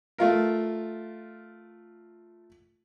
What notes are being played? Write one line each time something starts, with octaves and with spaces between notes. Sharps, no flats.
A3 F4 A#4